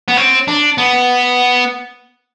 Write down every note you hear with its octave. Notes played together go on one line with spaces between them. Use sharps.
B3
C4
D4
B3